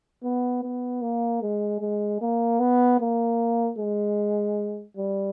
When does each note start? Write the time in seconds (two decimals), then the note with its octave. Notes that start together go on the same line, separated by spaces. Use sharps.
0.23 B3
0.63 B3
1.02 A#3
1.42 G#3
1.81 G#3
2.21 A#3
2.60 B3
3.00 A#3
3.78 G#3
4.97 G3